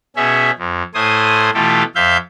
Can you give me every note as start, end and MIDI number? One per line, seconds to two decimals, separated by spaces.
0.16 0.51 47
0.16 0.51 61
0.16 0.51 68
0.16 0.51 76
0.58 0.82 41
0.94 1.50 45
0.94 1.50 57
0.94 1.50 72
0.94 1.50 80
0.94 1.50 87
1.54 1.83 47
1.54 1.83 52
1.54 1.83 57
1.54 1.83 65
1.54 1.83 67
1.54 1.83 69
1.95 2.17 41
1.95 2.17 76
1.95 2.17 77
1.95 2.17 91